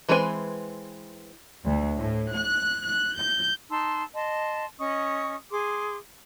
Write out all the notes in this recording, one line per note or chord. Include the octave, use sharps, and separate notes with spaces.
E3 G#3 C4 B4 G#5
D2
A2
F#6
F#6
G6
D#4 A5 C6 E6
D#5 A5 C6
C#4 D#5 C#6 D#6
G#4 C6 D6